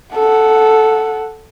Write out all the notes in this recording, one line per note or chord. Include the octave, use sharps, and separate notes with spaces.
A4 F#5